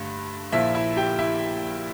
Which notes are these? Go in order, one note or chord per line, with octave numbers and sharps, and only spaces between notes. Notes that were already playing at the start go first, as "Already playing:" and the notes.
Already playing: G2 D3 A3
A#1 A#2 F3 E4 E5
E4 E5
G4 G5
E4 E5